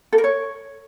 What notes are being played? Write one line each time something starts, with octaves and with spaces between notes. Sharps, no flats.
A4
A#4
C#5